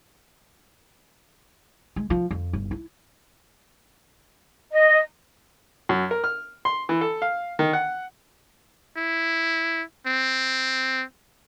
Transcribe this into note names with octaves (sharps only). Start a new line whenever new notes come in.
G#3
F3
F2
G1
E4
D#5
F#2
A#4
F6
C6
E3
A4
F5
D#3
F#5
E4
C4